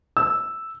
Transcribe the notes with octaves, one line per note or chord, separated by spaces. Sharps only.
E6